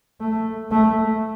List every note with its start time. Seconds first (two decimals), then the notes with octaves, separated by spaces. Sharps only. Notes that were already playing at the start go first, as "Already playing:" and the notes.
0.21 A3
0.71 A3